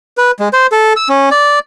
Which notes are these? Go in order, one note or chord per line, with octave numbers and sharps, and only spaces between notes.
B4
G#3
C5
A4
E6
C#4
D5